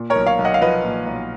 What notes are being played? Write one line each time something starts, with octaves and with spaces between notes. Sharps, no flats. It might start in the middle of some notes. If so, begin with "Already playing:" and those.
Already playing: A#2
A#4 C#5
B1
C#5 F5
B1
D#5 F#5
F5
F3 B4 D#5
A#2
B1